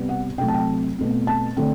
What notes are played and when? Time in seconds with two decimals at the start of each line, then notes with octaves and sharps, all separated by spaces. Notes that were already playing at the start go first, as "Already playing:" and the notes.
Already playing: C3 G3 B3
0.09 F#5
0.38 C3 F#3 A3 C4 G5
0.48 A5
0.54 G5
0.59 A5
0.98 B2 A3 C4
1.27 A5
1.57 D3 A3 C4